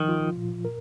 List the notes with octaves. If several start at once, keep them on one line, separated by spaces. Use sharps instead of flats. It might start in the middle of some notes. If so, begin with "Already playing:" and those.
Already playing: D#3 F3
F4
A#2
A#4